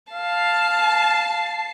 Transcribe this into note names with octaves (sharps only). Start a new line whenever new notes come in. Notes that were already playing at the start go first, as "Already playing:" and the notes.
F5 A5 C7